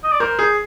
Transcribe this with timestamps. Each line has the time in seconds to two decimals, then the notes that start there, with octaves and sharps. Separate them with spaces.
0.04 D#5
0.12 D5
0.20 A#4 C5
0.39 G#4